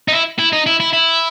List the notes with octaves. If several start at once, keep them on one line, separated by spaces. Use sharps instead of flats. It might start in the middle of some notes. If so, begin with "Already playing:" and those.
D#4
E4
E4
D#4
E4
E4
E4